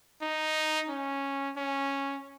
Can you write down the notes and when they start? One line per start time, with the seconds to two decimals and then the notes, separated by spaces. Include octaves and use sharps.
0.22 D#4
0.90 C#4
1.57 C#4